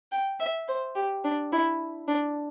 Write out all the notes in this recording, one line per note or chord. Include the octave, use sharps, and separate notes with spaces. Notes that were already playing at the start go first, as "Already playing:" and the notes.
G5
E5
C5
G4
D4
E4
D4